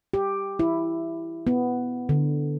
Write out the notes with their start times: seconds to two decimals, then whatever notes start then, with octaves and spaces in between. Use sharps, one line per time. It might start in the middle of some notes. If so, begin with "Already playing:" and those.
0.14 G4
0.59 E4
1.47 B3
2.09 D3